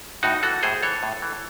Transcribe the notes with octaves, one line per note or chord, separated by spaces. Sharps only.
A2 D#4 F#4
E3 F#4 A4
A2 G#4 C5
E3 A4 C#5
A2
E3